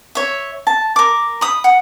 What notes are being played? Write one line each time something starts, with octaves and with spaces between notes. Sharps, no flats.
C#5 E5
A5
A#4 D6
B5 D#6
F#5